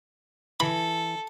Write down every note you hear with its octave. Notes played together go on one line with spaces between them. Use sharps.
E3 A4 B5